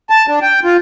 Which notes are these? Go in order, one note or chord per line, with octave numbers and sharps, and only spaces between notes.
A5
D4
G5
F4